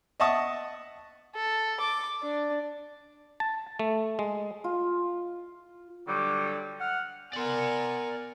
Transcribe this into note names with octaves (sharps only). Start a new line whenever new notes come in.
D#5 E5 F#5 A5 C#6 D#6
A4
D6
D4
A5
A3
G#3
F4
D3 F#3 G3 G4
F#5 F6
B3 A#4 D5 G#5 C6